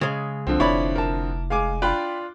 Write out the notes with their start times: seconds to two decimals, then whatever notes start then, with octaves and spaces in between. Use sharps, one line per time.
0.01 C#3 G#3
0.47 C2 D3 F3 C4
0.60 F1 E4 C#5 D5 B5
0.96 A#4 A5
1.50 G#3 F5 G#5 D6
1.82 D4 F4 G5 B5 F#6